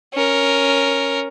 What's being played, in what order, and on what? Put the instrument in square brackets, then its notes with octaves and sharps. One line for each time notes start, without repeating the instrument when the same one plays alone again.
[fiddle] C#4 A#4